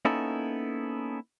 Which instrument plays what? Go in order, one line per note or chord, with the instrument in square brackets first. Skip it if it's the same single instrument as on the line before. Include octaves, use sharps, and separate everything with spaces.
[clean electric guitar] A#3 B3 C#4 D#4 E4 A4